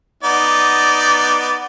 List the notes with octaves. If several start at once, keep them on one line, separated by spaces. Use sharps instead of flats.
B3 D#4 D5